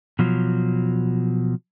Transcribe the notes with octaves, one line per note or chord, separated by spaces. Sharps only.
B2 F3 F#3